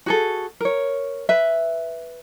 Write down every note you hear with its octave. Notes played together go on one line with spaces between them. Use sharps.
F#4 G#4 A4
A#4 C#5
B4 E5